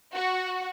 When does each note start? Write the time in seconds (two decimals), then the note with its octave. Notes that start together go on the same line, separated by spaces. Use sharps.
0.14 F#4